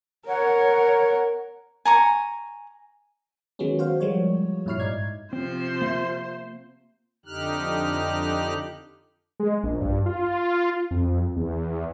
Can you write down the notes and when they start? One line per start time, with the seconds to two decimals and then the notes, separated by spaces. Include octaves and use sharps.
0.27 A#4 C#5 F#5
1.85 G#5 A#5 C#6
3.59 D#3 F#3 G#3 B3 C#4
3.79 F#4 C5 F5
4.00 F3 G3 G#3 A#3 F#4 C#5
4.66 G2 A#2 E4 C#5 F6 C7
4.80 G#2 D#4 D5 G#6
5.33 C3 F3 C4 C5
5.82 A#3 E5
7.26 F2 D3 D#4 G4 F6 F#6
9.40 G#3
9.63 A#1
9.81 G2
10.06 F4
10.91 F2
11.36 E2